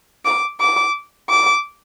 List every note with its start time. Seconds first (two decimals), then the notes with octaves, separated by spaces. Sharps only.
0.25 D6
0.61 D6
1.30 D6